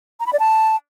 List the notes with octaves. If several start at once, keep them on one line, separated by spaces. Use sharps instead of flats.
A#5
B5
D5
A5